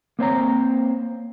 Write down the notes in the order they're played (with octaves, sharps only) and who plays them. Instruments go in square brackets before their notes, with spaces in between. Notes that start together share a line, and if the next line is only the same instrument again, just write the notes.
[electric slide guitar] A#3 C4 C#5 A#5